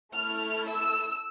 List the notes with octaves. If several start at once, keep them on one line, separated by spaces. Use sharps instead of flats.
A3 E4 A4 F6
E6